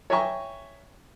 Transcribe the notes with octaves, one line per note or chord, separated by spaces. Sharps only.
C#5 E5 G5 G#5 A#5 C#6